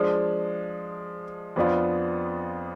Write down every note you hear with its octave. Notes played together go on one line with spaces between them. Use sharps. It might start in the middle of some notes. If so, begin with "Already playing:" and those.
Already playing: F3 G#3 D4
F2 F3 B3 D4 F4